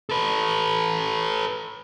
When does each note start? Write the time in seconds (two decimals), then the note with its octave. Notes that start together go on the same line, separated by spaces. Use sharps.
0.09 A4 B4